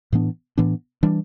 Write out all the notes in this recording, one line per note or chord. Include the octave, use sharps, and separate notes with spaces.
A2 E3 B3 D4
A2 E3 B3 D4
E3 G3 D4